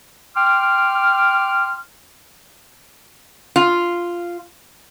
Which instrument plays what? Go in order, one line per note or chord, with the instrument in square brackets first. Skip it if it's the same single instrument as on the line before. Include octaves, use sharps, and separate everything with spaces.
[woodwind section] G5 C6 D6 F6
[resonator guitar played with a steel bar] F4